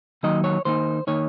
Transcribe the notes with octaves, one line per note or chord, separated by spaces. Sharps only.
D#3 F#3 A#3 D#4 D#5
C#5
D#3 A#3 D#4 C5
D#3 A#3 D#4 C#5